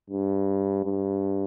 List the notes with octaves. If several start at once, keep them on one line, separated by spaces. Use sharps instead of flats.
G2
G2